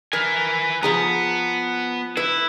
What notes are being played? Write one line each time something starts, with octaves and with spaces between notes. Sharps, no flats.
A#4 B4 G#5
F3 B3 G#4 A#5
E4 B4